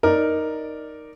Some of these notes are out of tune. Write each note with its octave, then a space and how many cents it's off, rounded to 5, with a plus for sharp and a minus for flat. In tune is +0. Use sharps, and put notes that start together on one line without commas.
D#4 +0 A#4 +0 D5 +0